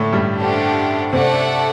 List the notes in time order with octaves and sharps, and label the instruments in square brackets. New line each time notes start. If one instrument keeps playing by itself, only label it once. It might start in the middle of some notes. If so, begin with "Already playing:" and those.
Already playing: [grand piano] A2 D3 A3 D4
G2 G3
[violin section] A3 D4 G4 C5 F#5
[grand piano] C3 C4 [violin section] A3 D4 A4 D5 F#5